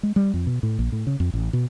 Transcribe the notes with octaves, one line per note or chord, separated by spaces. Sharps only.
G#3
G3
F2
B2
A2
A#1
A2
C#3
F2
A1
B2